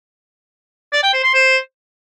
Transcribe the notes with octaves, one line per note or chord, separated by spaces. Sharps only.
D5
G5
C5
C6
C5